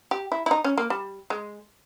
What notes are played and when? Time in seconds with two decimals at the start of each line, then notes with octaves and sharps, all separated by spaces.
0.11 G4
0.32 E4
0.46 E4
0.51 D#4
0.64 C#4
0.78 A#3
0.90 G3
1.30 G#3